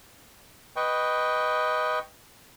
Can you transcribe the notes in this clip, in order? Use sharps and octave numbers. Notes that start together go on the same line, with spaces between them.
B4 D#5 G5 C#6